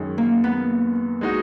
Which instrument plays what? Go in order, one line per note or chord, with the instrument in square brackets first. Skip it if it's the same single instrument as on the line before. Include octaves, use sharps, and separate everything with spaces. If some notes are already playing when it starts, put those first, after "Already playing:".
Already playing: [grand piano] F#2 D#3 G#3
[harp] A#3
B3
[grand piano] G#3 D#4 F#4